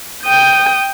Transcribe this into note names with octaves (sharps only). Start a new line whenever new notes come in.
G5 D#6 G6